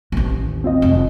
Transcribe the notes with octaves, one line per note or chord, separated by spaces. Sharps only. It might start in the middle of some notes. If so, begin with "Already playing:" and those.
A1 D#2
C4 F4 D#5
F1 C#4